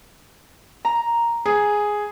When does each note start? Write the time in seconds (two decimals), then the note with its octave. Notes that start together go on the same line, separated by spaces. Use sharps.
0.85 A#5
1.46 G#4